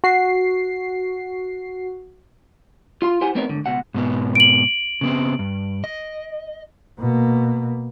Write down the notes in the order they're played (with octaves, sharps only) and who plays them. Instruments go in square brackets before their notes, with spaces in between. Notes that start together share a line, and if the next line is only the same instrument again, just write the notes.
[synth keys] F#4 C7
[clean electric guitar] F4 F5 C6
E4 G4 C5 F#5 G#5
A3 B3 C4 D#4 A#4 C#5
D2 G#2 D3
C#2 B2 F#5
[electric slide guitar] G#2 B2 B3
[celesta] D7 F#7
[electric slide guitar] C#3 B3 C4
G2
D#5
[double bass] B2 A#3